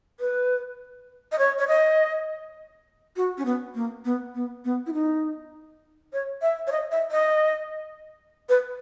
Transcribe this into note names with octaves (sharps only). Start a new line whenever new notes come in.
B4
D#5
C#5
C#5
D#5
F#4
C#4
B3
A#3
B3
B3
B3
E4
D#4
C#5
E5
C#5
D#5
E5
D#5
B4